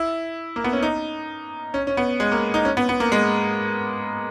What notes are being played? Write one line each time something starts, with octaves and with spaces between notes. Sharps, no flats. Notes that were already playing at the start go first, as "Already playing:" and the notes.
Already playing: E4
A#3
B3
C#4
D#4
C#4
C#4
B3
G#3
A#3
D#4
C#4
B3
B3
A#3
G#3